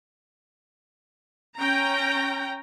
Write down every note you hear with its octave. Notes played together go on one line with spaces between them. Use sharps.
C#4 G5 A#5